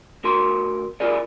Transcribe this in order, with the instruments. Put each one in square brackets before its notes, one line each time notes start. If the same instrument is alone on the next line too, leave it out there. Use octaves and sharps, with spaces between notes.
[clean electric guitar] D2 F#4 A#4 C6
E4 F4 G4 G#4 A#4 D5